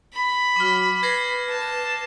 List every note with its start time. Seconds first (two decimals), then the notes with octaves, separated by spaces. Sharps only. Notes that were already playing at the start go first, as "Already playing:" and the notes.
0.13 B5
0.56 F#3 D6 F6
1.03 B4 G#6 A#6 C7
1.49 A5